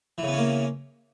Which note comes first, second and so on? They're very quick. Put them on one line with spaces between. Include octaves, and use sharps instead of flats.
E3 C#3 B3 C#4 A#3